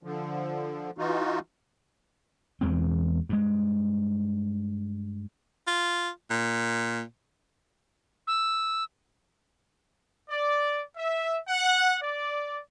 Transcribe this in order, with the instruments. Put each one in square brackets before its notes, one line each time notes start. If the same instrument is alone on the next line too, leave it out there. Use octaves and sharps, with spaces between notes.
[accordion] D3 F3
E3 D#4 F4 F#4
[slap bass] E2 E3 G#3 C4
G2 G#3
[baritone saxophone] F4
A#2
[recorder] E6
[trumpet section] D5
E5
F#5
D5